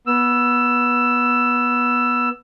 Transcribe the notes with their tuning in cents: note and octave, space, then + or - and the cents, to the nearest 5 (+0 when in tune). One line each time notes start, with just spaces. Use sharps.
B3 -15 E6 +15